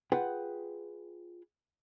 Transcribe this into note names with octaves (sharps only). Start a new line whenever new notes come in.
F4 G#4 B4 F#5 G5